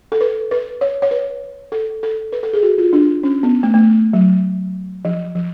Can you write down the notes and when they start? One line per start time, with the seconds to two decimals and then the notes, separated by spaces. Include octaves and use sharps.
0.12 A4
0.21 B4
0.51 B4
0.81 C#5
1.02 C#5
1.11 B4
1.72 A4
2.03 A4
2.32 B4
2.43 A4
2.53 G#4
2.63 F#4
2.78 F4
2.93 D4
3.23 C#4
3.43 B3
3.63 A3
3.74 A3
4.13 F#3
5.05 F3
5.35 F3